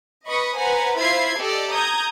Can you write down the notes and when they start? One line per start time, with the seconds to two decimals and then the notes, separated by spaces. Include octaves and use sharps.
0.26 B4 D#5 B5 C#6 D#6
0.56 B4 C5 F#5 G#5 A#5
0.97 E4 F4 C5 B5 G#6 C7
1.38 G4 A4 D5 D#5
1.71 A#5 D#6 G6 G#6